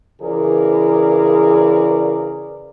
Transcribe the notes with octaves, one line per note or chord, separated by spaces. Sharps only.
C#3 E3 G#4 A#4 D5